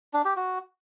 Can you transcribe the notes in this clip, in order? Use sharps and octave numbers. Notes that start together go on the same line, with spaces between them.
D4
G4
F#4